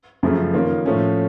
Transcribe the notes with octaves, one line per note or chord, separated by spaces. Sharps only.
F#2 C#3 F3 A3
D#3 A#3 C#4 F4
A2 F3 A3 C#4